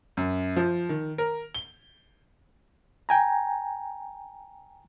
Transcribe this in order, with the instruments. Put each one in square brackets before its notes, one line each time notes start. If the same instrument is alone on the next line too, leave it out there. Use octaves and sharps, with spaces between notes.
[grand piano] F#2
F3
D#3
A#4
G7
[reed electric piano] G5 G#5 A#5